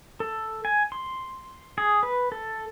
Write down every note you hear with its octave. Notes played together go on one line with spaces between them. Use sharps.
A4
G#5
C6
G#4
B4
A4